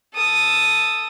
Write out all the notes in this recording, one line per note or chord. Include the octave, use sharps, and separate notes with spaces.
A4 D#6